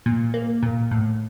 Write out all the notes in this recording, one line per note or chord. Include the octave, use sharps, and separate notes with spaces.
A#2
A#3
A#2
A2